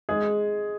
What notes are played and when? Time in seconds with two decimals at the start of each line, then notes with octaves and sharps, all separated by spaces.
0.09 G#3 G#4